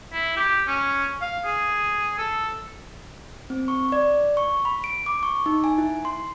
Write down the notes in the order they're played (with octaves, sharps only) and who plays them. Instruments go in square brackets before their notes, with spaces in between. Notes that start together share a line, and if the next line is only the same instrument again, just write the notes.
[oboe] E4
G4
C#4
F5
G#4
A4
[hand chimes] C4
C#6
D5
C#6
B5
D7
D6
C#6
D#4
G#5
E4
C6